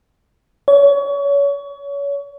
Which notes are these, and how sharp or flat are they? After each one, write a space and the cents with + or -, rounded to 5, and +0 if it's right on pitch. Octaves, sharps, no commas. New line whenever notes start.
C#5 +30